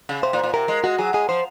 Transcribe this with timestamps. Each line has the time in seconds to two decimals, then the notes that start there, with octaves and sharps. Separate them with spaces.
0.09 C#3
0.23 C3 C5
0.33 A#2
0.43 A#2
0.54 C3 A#4
0.68 G#3
0.84 G#3 F#4
0.98 F#3 G#4
1.13 G#3 G#4
1.29 F3 C5